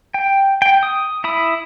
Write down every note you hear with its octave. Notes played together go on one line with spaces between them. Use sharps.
G5
G5
D#6
E4 B5 D#6